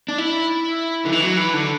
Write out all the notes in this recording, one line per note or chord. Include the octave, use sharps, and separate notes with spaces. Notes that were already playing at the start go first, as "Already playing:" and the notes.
D4
E4
D3
E3
F#3
E3
D3